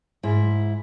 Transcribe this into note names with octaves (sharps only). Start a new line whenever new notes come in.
G#2 E4